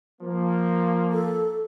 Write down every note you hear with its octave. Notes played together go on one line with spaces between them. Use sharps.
F3 A#3
A4